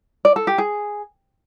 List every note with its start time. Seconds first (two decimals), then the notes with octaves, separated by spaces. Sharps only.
0.25 D5
0.36 A4
0.47 G4
0.58 G#4